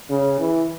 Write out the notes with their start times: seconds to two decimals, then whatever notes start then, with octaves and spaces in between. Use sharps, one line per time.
0.10 C#3
0.39 E3